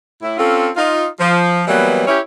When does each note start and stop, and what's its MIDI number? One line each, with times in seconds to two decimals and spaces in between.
0.22 0.35 45
0.22 0.35 64
0.38 0.68 60
0.38 0.68 61
0.38 0.68 65
0.38 0.68 69
0.76 1.05 63
0.76 1.05 65
1.19 1.63 53
1.68 2.05 52
1.68 2.05 54
1.68 2.05 55
1.68 2.05 58
1.68 2.05 59
2.07 2.19 61
2.07 2.19 64
2.07 2.19 67
2.07 2.19 73